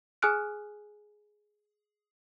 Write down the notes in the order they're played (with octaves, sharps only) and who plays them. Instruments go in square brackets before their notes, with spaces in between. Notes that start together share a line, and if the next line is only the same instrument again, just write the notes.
[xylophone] G#4 G#5 D#6 F6 F#6 D7